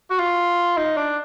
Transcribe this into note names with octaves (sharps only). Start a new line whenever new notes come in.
F#4
F4
D#4
D4